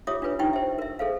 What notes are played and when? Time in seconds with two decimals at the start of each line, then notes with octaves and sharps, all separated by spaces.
0.07 F4 G4 C#5 E5 D6 D#6
0.22 D4 F4 B4 C#5
0.39 D#4 E4 G4 G5 C#6
0.53 C5 E5
0.79 A#4 E5
0.99 G#4 A4 C5 F5